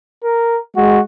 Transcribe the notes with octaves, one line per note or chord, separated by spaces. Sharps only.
A#4
G#3 F#4